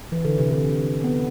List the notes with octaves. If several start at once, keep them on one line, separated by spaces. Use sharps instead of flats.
E3
D3
C3
D3
B3